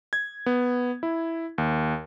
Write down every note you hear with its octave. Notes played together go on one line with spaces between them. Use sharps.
G#6
B3
E4
D#2